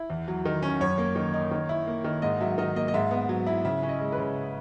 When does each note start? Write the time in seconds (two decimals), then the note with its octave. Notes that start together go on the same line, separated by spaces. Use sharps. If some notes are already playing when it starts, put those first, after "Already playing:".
Already playing: E4
0.10 E2
0.28 F#3
0.45 D#3
0.62 C#4
0.81 F#2 C#5
0.98 A#3
1.16 D#3
1.34 D#4
1.51 D#3
1.69 E4
1.87 A#3
2.04 D#3
2.22 G#2 D#5
2.41 F#3 E5
2.58 D#3 D#5
2.75 A#3 D#5
2.88 D#5
2.94 G#2 E5
3.11 B3
3.29 F#3
3.47 E4
3.65 C#3 E5
3.83 C#4
3.89 D#5
4.00 G#3
4.12 B4
4.18 C#3